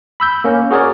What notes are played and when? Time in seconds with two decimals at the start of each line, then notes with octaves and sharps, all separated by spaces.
0.20 B5 E6 G6
0.44 A#3 C#4
0.71 F#4 G#4 A#4 C#5 D5